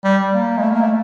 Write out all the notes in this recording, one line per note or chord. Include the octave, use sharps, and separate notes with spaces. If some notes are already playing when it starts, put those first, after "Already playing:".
G3
A#3
G#3
A3
A#3
A3